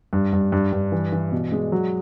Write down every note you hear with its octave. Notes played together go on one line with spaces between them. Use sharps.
G2
G2
G2
G2
E3
E3
B2
G#3
F#3